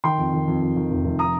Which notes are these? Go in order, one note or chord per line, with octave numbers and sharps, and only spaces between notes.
D#3 G5 C6
F2
D#3
F2
F2
D#3
F1
F1
A#5 D#6